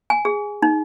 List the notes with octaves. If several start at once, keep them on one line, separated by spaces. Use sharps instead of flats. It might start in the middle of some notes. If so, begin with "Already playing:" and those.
G#5
G#4
D#4